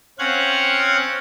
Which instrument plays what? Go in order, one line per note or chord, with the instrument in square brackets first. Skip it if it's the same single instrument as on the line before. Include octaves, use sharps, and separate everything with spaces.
[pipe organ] C4 C#4 F5 F#5 F#6 G#6